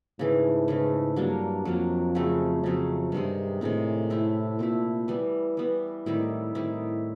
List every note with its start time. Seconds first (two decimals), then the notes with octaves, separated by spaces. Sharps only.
0.18 G#2 C#3 E3 A3
0.68 C#3 E3 A3
1.16 G2 F#3 A#3 D4
1.65 F2 F#3 A#3 D4
2.15 C#3 F#3 A3 C4
2.63 F2 C#3 F#3 A3 C4
3.12 G2 C3 D#3 G#3 C4
3.61 A2 C3 D#3 G#3 C4
4.10 A3 C4 E4
4.59 A#2 A3 C4 E4
5.08 E3 G3 B3
5.57 E3 G3 B3
6.06 A2 D#3 G3 C4 E4
6.55 A2 D#3 G3 C4 E4